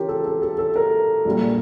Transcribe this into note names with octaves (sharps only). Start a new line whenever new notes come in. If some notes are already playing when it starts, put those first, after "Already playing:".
Already playing: C#3 E3 F4 G4 A#4 C#5
A4
A4
A4
A4
A#4
A#1 A#2 G3